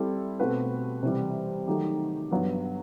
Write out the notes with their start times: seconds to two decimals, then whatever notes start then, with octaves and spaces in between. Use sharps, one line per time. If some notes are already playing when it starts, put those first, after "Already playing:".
Already playing: G3 C4 E4 A4
0.40 B2 A3 C4 F#4 B4
1.03 C3 E3 G3
1.67 D#3 F#3 A3 D#4 G4
2.31 G2 F#3 B3